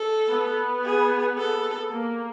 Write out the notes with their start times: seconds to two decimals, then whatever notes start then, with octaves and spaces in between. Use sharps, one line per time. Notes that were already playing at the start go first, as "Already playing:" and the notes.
Already playing: A4
0.31 B3
0.84 G#4
1.38 A4
1.91 A#3